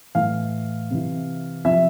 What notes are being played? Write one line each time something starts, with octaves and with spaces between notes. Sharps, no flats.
A2 E3 F5
C3 E3
C3 F3 E5